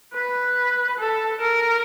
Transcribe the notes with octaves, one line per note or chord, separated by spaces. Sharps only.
B4
A4
A#4